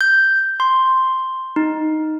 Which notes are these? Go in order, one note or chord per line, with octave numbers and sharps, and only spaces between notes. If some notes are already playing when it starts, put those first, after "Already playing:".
G6
C6
D#4